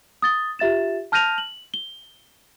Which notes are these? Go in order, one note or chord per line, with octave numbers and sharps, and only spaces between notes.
D#6 A6 G7
F4 G4 E5 A6 E7
A5 F6 G6 A#6 D#7 F7
F#7
G7